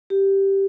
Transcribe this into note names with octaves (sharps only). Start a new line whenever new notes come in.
G4